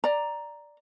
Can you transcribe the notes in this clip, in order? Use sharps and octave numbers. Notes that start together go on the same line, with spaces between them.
D5 A#5